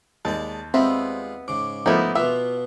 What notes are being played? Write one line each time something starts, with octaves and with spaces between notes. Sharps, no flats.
D#2 G#3 D5 A5
G3 G#3 B3 C4 F4 E5
G#2 C#3 D6
F3 A3 B3 D#4 E4
B2 B3 F4 E5